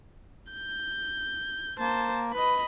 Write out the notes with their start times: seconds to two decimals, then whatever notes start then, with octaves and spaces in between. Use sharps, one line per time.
0.52 G6
1.79 A#3 C5 A5
2.34 B4 D#5 B5